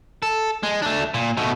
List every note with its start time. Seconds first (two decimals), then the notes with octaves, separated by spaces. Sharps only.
0.22 A4
0.63 G#3
0.82 A3 D4
1.14 A#2
1.37 B2 A3